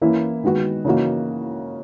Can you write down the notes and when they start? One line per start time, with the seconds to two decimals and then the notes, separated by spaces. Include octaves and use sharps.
0.01 E3 A#3 C#4 E4
0.44 D#3 G#3 B3 F#4
0.85 C#3 E3 A#3 D#4 F#4